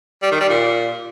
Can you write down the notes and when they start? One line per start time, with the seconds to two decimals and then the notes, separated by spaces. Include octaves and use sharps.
0.23 G3
0.32 D#3
0.41 G3
0.50 A#2